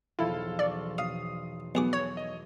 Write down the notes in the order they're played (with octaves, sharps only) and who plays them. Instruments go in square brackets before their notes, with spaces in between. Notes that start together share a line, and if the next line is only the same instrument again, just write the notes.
[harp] B1 E2 F3 [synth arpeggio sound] E4 [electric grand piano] F4 A4 F5
[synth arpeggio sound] D5 [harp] C#6
[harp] B1 [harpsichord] F5 [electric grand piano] D#6 C7
[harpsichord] B1 G#4 D6 [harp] A3 F#4 [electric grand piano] B3
[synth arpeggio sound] C#5
[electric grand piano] D#5